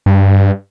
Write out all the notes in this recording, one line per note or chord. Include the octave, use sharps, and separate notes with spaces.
G2